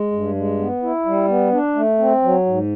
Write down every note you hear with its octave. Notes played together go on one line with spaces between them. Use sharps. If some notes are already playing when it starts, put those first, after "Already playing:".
Already playing: G#3
G2
G#3
B3
E4
G3
B3
D4
A3
C4
F#3
G#2